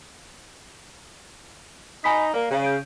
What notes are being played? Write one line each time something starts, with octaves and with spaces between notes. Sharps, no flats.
D#4 G#5 B5 B6
A#3 D5 F5
C#3
G6 D7 D#7